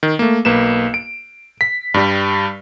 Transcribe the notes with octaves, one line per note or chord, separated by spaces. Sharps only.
D#3
A3 A#3
B1 A#3 B4 E7
D7
B6
G2 G3